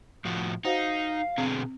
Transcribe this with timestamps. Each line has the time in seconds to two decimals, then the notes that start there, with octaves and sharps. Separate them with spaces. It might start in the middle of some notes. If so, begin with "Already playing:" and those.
0.25 A2 F3 F#4
0.65 D#4 F#4 C5 F5 F#5
1.38 B2 D3 C4 G#4